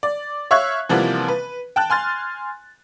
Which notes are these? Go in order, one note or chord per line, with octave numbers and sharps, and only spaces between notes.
D5
C#5 E5 F5 C#6 F#6 G#6
C3 E3 F3 G3 A#3 B3
B4
G5 A5 F#6
G#5 C6 F6 A6